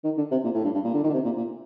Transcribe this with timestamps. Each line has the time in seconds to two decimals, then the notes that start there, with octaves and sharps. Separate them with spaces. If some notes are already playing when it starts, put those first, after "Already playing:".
0.04 D#3
0.17 D3
0.31 C3
0.44 A#2
0.54 A2
0.64 G2
0.74 G2
0.84 A#2
0.94 D3
1.04 D#3
1.09 D3
1.13 C3
1.24 A#2
1.37 A#2